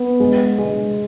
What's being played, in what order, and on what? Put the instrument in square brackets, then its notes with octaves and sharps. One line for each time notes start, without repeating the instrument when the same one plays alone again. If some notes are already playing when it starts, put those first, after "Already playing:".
Already playing: [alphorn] B3
[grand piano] G#3
G#3